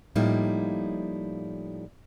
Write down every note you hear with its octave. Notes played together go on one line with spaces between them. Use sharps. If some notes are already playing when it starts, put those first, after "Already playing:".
A2 F3 G3 A#3 D#4 E4